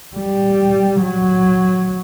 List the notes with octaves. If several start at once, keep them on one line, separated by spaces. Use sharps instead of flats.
G3
F#3